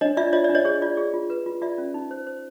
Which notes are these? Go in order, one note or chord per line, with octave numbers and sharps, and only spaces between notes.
D4 C#5 D#5
F4 D5 E5
F4 C#5 D#5
D5 E5
D4
C#5 D#5
G#4 C#5
F4 D5
G#4
F4
B4
F4
F4 D5 E5
C#4
D#4
C5
C5